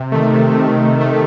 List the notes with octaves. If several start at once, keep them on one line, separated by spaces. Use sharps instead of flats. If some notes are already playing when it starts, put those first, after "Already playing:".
Already playing: C3
D#3 A3
C3
D#3 A3
C3
D#3 A3